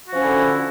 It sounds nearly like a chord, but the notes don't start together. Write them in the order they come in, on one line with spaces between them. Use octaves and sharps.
F#4 F3 C#4 E4 D3